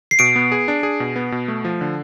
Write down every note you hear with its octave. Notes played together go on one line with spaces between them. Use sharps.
C7
B2 D7
B3
G#4
D4
G#4
B2
B3
B2
A3
F3
D3